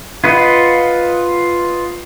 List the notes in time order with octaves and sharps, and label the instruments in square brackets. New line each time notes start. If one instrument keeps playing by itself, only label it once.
[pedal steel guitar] F4 B4 D#5 F#5